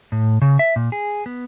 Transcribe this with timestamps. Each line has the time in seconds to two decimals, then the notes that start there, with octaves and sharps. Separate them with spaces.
0.12 A2
0.42 C#3
0.59 E5
0.76 A#2
0.92 G#4
1.26 B3